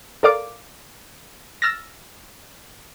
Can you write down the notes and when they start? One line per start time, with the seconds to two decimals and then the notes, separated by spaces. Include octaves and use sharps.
0.23 A4 A#4 D5 F5 D6
1.62 E6 F6 A6 A#6